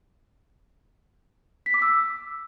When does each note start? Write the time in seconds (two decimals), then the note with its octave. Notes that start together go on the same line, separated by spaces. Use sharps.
1.66 B6
1.74 D6
1.82 E6